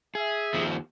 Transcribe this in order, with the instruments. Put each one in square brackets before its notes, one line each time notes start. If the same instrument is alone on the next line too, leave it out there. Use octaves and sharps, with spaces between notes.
[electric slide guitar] G#4 [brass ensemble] E5
[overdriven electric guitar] D#2 F3